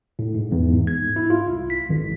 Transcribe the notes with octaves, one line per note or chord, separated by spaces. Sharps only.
A2
G#2
E2
G#2
G#6
E4
F4
C2
B6
G#1